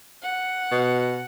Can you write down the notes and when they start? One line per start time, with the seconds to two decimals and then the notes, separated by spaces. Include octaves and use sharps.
0.22 F#5
0.71 B2